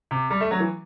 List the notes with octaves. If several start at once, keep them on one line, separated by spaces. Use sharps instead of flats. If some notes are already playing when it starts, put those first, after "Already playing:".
C3
G3
A3
F#3
E3